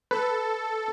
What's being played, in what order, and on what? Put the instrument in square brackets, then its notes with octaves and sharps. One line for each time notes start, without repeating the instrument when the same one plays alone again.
[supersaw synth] A4 [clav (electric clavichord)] B4